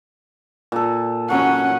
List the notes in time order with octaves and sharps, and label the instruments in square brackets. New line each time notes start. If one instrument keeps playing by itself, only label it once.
[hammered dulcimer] A#2 A4
[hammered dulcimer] F#3 [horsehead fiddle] C#4 F#5